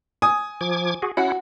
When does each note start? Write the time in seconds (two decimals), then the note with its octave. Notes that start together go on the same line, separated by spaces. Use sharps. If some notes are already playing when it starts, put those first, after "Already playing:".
0.22 G#5 D#6
0.61 F3 D6 G#6
1.02 F#4 G#4
1.17 C#4 E4 F#4 F#5